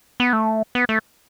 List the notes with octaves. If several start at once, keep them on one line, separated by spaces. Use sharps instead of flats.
B3
A3
B3
A3